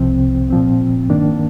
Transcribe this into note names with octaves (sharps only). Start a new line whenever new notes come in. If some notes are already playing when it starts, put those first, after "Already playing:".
Already playing: C2 C3 F3 C4
A#2 F3 C4
G2 D#3 A#3 D4